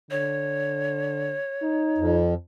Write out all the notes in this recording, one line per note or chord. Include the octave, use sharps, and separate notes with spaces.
D3 C#5
D#4
F2